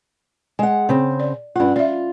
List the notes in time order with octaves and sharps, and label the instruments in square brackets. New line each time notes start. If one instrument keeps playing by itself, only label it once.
[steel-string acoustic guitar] G#3 F#5 [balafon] G#5
[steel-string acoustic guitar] C#3 C4
[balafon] D5
[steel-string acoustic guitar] G2 F#5 [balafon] C#4 F4
[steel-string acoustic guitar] F4 [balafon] D5 E5